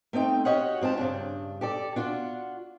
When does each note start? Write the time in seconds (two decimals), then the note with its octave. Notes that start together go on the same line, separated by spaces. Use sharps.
0.13 A3 C4 D#4 G5
0.45 F#4 G4 C#5 D#5 F5 F#5
0.81 G#2 C4 F4 A5
0.97 G2 C#3 D4
1.61 G4 A4 D5
1.96 D4 F4 F#4